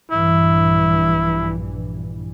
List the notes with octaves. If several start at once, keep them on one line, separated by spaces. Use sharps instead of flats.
A#1 G2 E3 E4